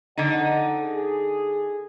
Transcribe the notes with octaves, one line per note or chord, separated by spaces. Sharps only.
F2 D3 D#4 D#5 F#5
G#4